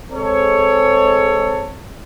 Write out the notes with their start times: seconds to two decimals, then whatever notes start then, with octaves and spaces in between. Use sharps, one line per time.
0.11 G#3 C4 A4 C#5